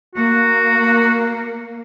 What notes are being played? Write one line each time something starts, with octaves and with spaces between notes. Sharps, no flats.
A#3 F#4